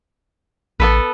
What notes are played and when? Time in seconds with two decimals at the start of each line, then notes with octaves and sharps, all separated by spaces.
0.80 A1 B3 A4 B4